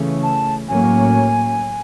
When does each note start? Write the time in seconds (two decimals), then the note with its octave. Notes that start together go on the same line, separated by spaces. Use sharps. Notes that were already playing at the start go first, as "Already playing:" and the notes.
Already playing: C#3 E3 A3 C#4
0.23 A5
0.68 A2 F#3 A#3 C#4 G#5